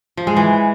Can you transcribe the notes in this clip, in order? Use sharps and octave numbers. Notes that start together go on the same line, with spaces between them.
F3
G#3
E3